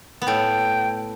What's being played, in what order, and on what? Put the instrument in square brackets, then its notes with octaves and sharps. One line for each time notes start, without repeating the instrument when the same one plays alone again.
[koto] B3
[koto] A2 A3 [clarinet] G5